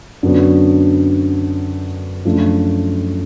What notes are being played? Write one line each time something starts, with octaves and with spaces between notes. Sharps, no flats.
F#2 D3 F#3 B3 D4
F#2 F3 A3 D4 F4